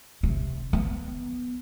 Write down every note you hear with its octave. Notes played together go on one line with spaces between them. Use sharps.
C3
B3